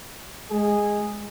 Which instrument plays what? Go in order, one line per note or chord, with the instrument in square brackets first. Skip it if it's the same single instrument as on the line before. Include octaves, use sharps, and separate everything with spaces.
[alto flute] G#3 [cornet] G#4